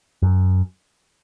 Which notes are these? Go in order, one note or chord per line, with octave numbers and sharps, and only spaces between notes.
F#2